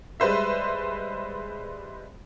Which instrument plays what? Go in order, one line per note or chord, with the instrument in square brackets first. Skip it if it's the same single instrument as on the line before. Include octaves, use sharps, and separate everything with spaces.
[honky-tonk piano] G3 G#3 B4 C5 E5